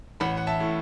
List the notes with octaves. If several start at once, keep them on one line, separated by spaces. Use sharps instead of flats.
A1 F#5 B5
F#5
E5 A5
A2